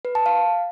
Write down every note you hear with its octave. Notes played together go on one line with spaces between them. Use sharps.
B4
A5
F5